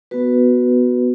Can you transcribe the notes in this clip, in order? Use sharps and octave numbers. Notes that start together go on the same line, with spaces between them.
B3 F#4 B4